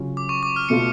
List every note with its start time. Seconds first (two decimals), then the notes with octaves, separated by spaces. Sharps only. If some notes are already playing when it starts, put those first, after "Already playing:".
Already playing: C#3 F#3 C#4 F4
0.17 D6
0.29 C#6
0.43 D6
0.56 F6
0.69 B2 A3 F4 C#7